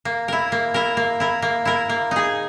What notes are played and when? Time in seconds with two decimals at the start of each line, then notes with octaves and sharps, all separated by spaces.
0.05 A#3
0.28 E4 A#4
0.52 A#3
0.74 E4 A#4
0.97 A#3
1.20 E4 A#4
1.42 A#3
1.65 E4 A#4
1.89 A#3
2.11 D#4 G#4